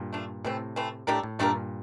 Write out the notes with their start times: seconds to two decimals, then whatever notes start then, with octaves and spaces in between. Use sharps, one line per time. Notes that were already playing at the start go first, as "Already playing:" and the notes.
Already playing: G2 A#2
0.13 A3 D4 F4
0.45 A2 C3 E3 A3 C4
0.76 E3 A3 C4
1.07 A2 A3 D4 G4 A#4
1.23 A2
1.39 G2 A#2 A3 D4 G4 A#4